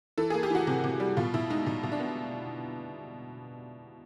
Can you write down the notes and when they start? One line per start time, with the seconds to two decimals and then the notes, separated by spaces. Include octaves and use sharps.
0.18 E3 A4
0.30 A#3 G#4
0.43 G4
0.50 E3 F#4
0.67 C3
0.84 C3
1.00 G3
1.17 B2 F4
1.34 B2 E4
1.50 G#3 D#4
1.66 B2 D#4
1.83 B2
1.92 D4
2.00 B3